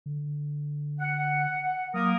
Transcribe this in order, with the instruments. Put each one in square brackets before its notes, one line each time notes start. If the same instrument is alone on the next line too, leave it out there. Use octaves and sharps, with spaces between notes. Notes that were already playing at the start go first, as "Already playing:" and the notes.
[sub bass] D3
[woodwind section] F#5
[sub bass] F#3 [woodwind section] A#3 A#4 D#6